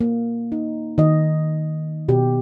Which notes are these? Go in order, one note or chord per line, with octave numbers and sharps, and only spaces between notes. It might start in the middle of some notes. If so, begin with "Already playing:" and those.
A#3
D#4
D#3 D#5
B2 G4